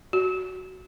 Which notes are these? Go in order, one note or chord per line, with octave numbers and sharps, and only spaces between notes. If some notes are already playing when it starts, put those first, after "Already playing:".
F#4